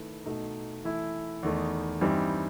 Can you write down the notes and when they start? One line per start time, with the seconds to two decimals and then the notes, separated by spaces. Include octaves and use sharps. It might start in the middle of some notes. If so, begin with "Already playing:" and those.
Already playing: D#3 A3 E4 B4
0.26 B2 A3 D#4
0.84 E3 A3 E4
1.43 E2 D#3 A3 D#4
2.01 G2 E3 G3 C4 D#4